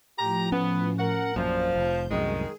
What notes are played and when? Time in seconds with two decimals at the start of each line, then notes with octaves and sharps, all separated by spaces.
0.19 A2 F3 G4 A#5
0.52 B3 C#4
0.99 A#4 F#5
1.36 A#1 F#2 A#2 F3 D5
1.75 F1 C5 G6
2.10 C2 F#2 A2 D#3 G#3 G#4